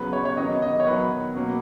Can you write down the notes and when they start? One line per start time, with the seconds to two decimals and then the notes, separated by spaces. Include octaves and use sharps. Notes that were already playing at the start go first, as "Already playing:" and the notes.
Already playing: C#3 F#3 B3 B4
0.13 C#5
0.25 C#5
0.37 D#3 F#3 B3 D#5
0.62 D#5
0.80 C#5
0.87 D#3 F#3 B3 B4
1.35 B2 F#3 A#3